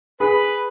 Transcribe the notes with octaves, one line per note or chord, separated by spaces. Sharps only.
G#4 B4